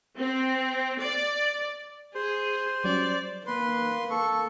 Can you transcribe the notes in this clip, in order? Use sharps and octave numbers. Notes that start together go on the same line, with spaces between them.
C4
D5
G#4 C5
F#3 G3 C#4 D5
A#3 B4 C6
A4 C#6